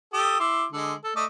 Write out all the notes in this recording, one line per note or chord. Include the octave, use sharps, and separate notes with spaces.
G4 A4 D#6
E4 C6 D6
D3 G#3
A4
A3 D5 D#5